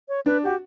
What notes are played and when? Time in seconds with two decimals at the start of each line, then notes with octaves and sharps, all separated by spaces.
0.09 C#5
0.26 D4 B4
0.43 F#4 G4